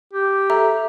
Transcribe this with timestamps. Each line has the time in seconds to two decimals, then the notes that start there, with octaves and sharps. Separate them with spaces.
0.13 G4
0.50 A4 E5 A#5